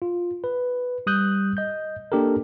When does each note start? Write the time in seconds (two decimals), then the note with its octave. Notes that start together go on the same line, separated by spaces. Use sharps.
0.02 F4
0.44 B4
1.07 G3 D#6 F#6 G6
1.57 D#5 G6
2.12 A#3 D4 G4 A4 A#4